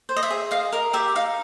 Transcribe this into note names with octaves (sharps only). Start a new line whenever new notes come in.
C5
D#5
E5
G#4
D#5 F5
A#4 D#5
G4 E5
D#4 F5